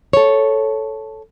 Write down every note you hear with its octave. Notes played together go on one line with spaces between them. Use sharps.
A4 C#5